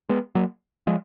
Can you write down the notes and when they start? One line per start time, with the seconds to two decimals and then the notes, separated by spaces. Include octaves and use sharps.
0.09 G#3 B3
0.35 F#3 A#3
0.87 F3 G#3